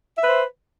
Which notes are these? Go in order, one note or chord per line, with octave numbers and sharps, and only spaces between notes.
B4 C5 E5